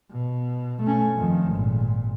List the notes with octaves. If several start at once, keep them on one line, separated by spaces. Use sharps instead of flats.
B2
A3 C#4
F2 D#3
G#1 A#2